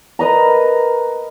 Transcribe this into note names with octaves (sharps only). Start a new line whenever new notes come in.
A#4 B4 D#5 A#5